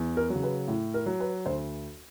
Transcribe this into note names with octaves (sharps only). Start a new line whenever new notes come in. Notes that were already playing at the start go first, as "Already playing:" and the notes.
Already playing: E2
A#4
C#3 F#3
B4
A2
A#4
F#3
B4
D2 C5